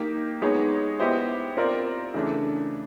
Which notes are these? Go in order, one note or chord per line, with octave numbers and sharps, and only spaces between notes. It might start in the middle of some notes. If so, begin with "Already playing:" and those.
Already playing: A#3 D#4 G4
G#3 B3 D#4 G#4 C#5
B3 E4 G4 C5 D#5
C4 F4 A#4 D5
C#3 E3 A3 D4